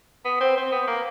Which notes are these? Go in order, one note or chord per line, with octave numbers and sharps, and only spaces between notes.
B3
C4
C4
B3
A#3